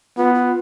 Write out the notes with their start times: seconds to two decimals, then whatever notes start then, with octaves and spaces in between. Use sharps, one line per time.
0.17 B3 F4
0.35 F4